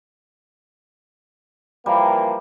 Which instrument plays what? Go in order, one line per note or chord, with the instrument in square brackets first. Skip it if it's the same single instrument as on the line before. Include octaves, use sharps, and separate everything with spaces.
[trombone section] E3 F3 A#3 [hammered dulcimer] G3